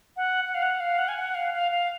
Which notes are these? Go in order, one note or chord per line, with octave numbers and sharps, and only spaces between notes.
F#5
F#5
F5
F#5
F5
F#5
G#5
F#5
F5
F5
F5